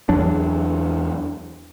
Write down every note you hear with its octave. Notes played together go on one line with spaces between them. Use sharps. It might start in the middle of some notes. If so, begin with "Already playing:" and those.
E2 F#3 D4